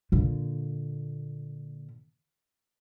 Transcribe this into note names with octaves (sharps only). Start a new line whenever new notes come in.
A#2 D3